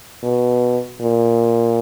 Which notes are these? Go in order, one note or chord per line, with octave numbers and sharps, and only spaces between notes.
B2
A#2